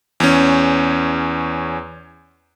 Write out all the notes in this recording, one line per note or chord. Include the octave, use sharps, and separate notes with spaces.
E2 C#4